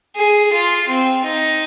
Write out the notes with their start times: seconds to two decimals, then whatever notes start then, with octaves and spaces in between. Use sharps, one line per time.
0.16 G#4
0.52 F4
0.88 C4
1.25 D#4